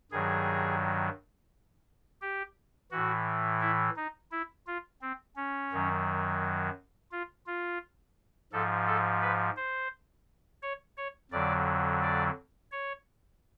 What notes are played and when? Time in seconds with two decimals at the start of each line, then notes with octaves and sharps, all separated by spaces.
0.11 G2 D#3 F#3 G#4
2.21 G4
2.91 A2 E3 F#4
3.61 E4
3.97 D#4
4.32 E4
4.67 F4
5.02 C4
5.36 C#4
5.72 F#2 D#3 F#3
7.12 F4
7.47 F4
8.52 G#2 F3 A4
8.87 A4
9.21 B4
9.56 C5
10.62 C#5
10.97 C#5
11.31 F2 D3 F#3 D5
12.02 D5
12.71 C#5